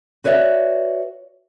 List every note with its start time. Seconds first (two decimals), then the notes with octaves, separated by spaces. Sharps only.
0.24 F#4 B4 C#5 D5 E5